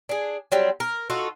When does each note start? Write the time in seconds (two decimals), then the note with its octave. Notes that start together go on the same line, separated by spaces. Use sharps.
0.09 D4 G#4
0.52 F#3 G3 C4
0.80 A#4
1.10 D#4 F4 F#4 A4